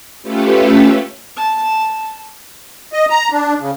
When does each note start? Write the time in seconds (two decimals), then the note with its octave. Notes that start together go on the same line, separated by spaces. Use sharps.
0.22 A3 C#4 F4 G4 A4 B4
1.37 A5
2.93 D#5
3.10 A#5
3.32 D4
3.60 C#3